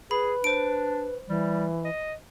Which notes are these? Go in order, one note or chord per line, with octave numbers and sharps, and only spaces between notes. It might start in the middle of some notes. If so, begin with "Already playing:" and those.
G#4 B4 B5
D4 C5 D7
E3 G3
D#5